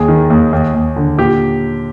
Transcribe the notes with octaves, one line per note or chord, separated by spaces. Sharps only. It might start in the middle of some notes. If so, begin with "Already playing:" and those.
Already playing: D#2 G#4
D#3
D#2
D#2
D#2
D3
A#2 G4